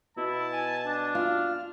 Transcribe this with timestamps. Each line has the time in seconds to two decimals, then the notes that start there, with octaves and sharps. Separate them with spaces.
0.17 B2 E4 A5
0.53 G#5
0.85 D4
1.15 F4 F6